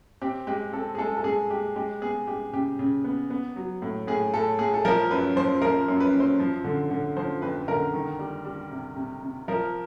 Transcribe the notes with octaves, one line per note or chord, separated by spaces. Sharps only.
C4 G4
G#3 G4
C4 A4
G#4
G#3 A4
A4
G#3 G#4
G#3 G4
G#3 G4
B3 G#4
G#3 G4
C#3 G4
C#3
B3
B3
F#3
A2
A2 G#4
A2 A4
A2 G#4
A4
F3 A#4
F#2 B4
F3 C5
F3 A#4
F#2
B4
F#2
C5
F3
D3
D3
F3 C5
F2 B4
D3 A#4
D#3
G3
G3
C3
C3
C3
F3 A#4